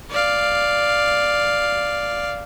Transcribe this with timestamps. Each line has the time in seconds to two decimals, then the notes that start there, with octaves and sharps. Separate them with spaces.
0.10 D5 F5